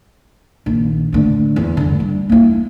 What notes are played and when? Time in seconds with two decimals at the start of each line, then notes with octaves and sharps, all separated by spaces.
0.66 A#1 D#3
1.13 A2 D3
1.56 E2
1.77 G2 D3
2.00 G3
2.29 A#3 E4